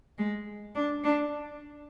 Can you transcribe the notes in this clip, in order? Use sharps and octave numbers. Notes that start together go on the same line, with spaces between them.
G#3
D4
D4